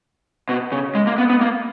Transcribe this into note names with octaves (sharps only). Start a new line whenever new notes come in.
B2
C#3
G#3
A#3
B3
B3
A#3